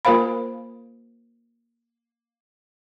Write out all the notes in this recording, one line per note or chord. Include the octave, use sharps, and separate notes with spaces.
A#3 F4 A#4 C5 F5 B5